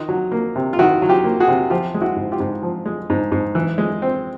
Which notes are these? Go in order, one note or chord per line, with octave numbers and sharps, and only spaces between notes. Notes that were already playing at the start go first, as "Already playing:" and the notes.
Already playing: D#3 D#4 F4
F#3
A#3
C3
F4
D#3 E4 F#4
F#3
F4 G4
A#3
F#4 G#4
C3
F3 F4 G4
G#3
E4 F#4
G#2
F4 G4
G#2
F3
G#3
G#2
G#2
E3
G#3
C4